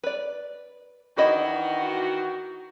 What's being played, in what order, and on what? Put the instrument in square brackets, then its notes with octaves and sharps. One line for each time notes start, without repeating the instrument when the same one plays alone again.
[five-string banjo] B4 D5
[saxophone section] D#3 E3 F#4 [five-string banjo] D4 E4 D#5